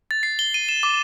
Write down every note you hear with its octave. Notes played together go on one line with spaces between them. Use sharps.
A6
C7
G7
D#7
E7
D6